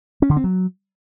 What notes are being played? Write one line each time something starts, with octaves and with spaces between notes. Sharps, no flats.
C#4
D3
C4
F#3